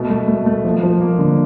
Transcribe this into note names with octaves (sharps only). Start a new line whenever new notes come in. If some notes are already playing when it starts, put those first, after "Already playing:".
Already playing: B2 A3
A3
A3
A3
F3
F3
A#3
D3